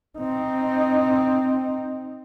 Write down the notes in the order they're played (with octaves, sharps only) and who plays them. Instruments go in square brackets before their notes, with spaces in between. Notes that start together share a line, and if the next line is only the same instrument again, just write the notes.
[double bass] C4 D#4